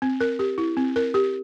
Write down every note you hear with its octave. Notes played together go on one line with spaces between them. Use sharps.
C4
A#4
G4
E4
C4
A#4
G4